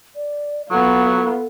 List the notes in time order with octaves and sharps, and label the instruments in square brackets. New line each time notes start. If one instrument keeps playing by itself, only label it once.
[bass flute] D5
[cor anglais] F#3 [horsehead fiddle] B3 F4 [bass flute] A4